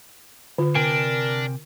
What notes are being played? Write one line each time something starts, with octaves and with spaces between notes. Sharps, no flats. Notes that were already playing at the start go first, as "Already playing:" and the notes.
D3 F4
C3 D4 A#4 G5 G#5